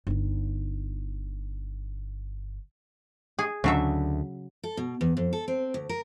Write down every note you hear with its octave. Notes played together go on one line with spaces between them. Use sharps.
G1 D#4
G#4
D2 C#3 F#3 G#3 D4 E5
A4
B2
E2
F2
A4
C4
D2
A#4